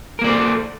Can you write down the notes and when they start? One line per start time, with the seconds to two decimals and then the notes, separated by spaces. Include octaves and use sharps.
0.19 A#4
0.22 A#3
0.24 D5
0.27 C5
0.29 A4